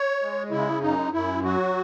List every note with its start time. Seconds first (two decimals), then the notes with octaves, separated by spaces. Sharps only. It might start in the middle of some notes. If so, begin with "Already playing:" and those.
Already playing: C#5
0.22 G#3
0.51 C#3 E4
0.82 F#2 D#4
1.12 F#2 E4
1.43 F#3 F#4